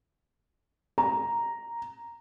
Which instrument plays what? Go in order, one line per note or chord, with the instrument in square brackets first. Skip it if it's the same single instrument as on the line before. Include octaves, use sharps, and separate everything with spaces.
[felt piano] A#5